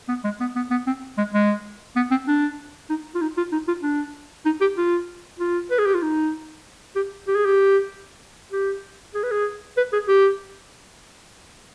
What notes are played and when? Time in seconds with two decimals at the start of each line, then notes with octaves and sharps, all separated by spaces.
0.08 B3
0.24 G#3
0.40 B3
0.56 B3
0.70 B3
0.87 C4
1.18 G#3
1.34 G#3
1.96 B3
2.11 C4
2.28 D4
2.90 D#4
3.15 F4
3.21 D#4
3.37 F4
3.52 D#4
3.67 F4
3.83 D4
4.45 D#4
4.61 G4
4.77 F4
5.39 F4
5.71 B4
5.78 G#4
5.86 G4
5.94 F4
6.02 D#4
6.96 G4
7.27 G4
7.35 G#4
7.45 G4
8.52 G4
9.14 G#4
9.23 B4
9.31 G#4
9.77 B4
9.93 G#4
10.08 G4